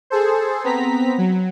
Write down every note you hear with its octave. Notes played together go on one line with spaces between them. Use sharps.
G#4 A4 C5
B3 C4 A#5 B6
F#3